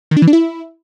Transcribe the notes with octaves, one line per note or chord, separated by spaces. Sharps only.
D#3
D4
E3
D4
E4